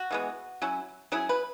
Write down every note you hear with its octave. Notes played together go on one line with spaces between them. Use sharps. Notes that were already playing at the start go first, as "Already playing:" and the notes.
Already playing: F#4
E3 G#3 B3
F#3 C#4 E4
F#3 C#4 E4 G#4
B4